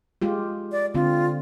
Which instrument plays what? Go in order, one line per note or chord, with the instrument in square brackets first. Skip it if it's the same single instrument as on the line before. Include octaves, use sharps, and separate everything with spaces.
[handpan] G#3 F4 G4
[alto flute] D5
[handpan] D3 C4 [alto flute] F4